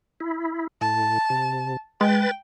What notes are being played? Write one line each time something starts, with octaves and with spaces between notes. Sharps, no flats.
E4
A2 A5
C3
G#3 B4 G5 A6